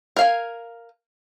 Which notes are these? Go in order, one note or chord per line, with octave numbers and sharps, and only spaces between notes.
A#4 F5 G#5